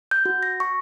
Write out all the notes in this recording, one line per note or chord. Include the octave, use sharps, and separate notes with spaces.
G6
F#4
A#6
C#6